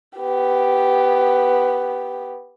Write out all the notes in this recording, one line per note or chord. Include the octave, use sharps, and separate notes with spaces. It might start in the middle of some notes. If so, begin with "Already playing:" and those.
B3 G4